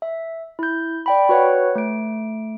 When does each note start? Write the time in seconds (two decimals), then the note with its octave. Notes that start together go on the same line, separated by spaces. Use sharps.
0.02 E5
0.59 E4 G6
1.06 D5 G5 B5
1.29 F#4 B4 C#5 F#5
1.75 A3 D7